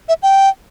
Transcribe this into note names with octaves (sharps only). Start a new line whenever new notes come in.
E5
G5